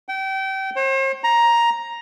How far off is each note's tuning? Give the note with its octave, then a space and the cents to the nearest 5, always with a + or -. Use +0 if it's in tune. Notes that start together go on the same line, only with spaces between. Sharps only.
G5 -30
C5 +45
A#5 +10